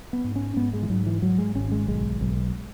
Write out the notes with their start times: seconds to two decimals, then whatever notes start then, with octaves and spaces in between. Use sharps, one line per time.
0.13 B3
0.24 G#2
0.36 C#4
0.56 G#2 B3
0.73 G#3
0.82 E3
0.90 G#2 F#3
1.06 E3
1.22 G#2 F#3
1.39 G#3
1.55 G#1 C#4
1.72 G#3
1.88 B1 G#3
2.21 B1